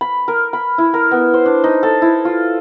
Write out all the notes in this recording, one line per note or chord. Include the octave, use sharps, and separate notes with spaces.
B5
A#4
B5
E4
A#4
B3
C5
D4
D#4
A4
E4
F4